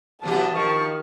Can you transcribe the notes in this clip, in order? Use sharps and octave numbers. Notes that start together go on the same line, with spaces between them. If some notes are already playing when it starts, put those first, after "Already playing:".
B2 E3 F#3 G4 A5
D#3 F3 C#6